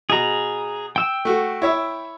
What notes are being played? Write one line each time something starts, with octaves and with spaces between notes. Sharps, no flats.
B2 G#4 A#5
G5 E6
A3 F#4
E4 C#5 E5